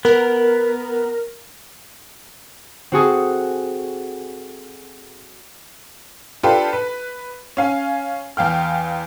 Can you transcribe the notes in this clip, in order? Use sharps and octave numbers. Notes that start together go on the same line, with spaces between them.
B3 A#4
C4 F#4 G#4 A4
D4 F4 G4 A4 B4
B4
C#4 F5 G#5
E2 F5 G5 F6